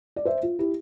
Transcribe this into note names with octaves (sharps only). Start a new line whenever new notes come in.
D5
C5 E5
F4
E4 G4